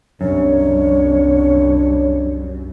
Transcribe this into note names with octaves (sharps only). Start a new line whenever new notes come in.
C2 F#2 D4 C#5